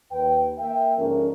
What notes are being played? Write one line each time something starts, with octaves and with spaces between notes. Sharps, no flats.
D#2 B4 G5
A#3 E5 G5
G#2 D3 F3 C#4 A#4